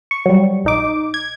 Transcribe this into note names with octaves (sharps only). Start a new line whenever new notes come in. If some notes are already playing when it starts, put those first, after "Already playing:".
C#6
F#3 G3
A#1 D#4 D6
G#6